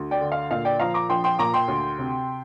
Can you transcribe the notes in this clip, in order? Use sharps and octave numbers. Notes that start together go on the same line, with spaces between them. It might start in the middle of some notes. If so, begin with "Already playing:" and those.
Already playing: D2
D5 G5
D3
F5
A#2 F5
D5 G5
F3 F5 A#5
A#5 D6
A#1 G5 C6
G5 C6
A#2 A#5 D6
G5 C6
D2
C3